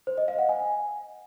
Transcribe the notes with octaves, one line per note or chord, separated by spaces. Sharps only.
C5
D#5
F5
F#5
G#5